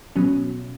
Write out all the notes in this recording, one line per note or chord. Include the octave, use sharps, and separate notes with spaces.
B2 F#3 C#4